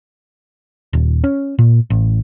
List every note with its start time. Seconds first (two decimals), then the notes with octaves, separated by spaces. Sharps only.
0.93 D#1
1.24 C#4
1.59 A#2
1.90 A1